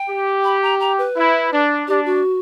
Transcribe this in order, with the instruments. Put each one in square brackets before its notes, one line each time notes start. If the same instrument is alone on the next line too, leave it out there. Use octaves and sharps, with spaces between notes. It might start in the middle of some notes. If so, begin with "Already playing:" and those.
Already playing: [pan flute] G5
[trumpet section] G4
[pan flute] B5
A#5
A#5
B4
[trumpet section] E4
D4
[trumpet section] D4 [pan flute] G4
[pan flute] F#4